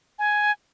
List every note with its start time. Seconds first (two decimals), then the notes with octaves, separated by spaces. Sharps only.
0.19 G#5